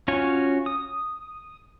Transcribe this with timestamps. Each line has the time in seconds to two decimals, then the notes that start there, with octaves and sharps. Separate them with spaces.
0.08 C#4 F4 F#4 C#5 G#5
0.66 D#6